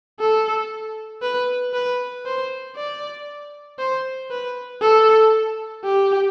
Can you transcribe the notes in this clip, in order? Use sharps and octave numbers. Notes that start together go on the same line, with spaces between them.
A4
B4
B4
C5
D5
C5
B4
A4
G4